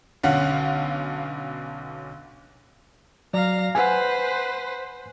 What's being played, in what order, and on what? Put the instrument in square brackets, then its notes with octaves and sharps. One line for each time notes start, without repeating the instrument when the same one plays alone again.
[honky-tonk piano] B1 D3 C#4 F5 F#5
[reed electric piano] F#3 D5 [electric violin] F5 A#5
[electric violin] B4 C5 [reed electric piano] F#5 G#5